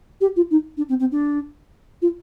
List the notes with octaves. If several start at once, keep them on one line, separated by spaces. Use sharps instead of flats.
G4
F4
D#4
D4
C4
C4
D4
F4